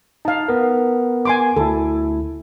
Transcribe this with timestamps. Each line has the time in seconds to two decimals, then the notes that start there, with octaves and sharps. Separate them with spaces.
0.25 D#4 F5 A5
0.48 B3 A#4
1.25 G#5 C6 D6
1.56 D2 E4 A4